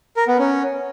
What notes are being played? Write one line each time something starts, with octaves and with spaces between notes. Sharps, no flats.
A#4
B3
C#4